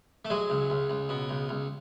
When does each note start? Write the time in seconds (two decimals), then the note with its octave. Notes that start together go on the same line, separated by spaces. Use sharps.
0.25 A3
0.30 F#3 G#3
0.50 C#2
0.70 C#2
0.90 C#2
1.09 B2
1.29 C#2
1.49 C#2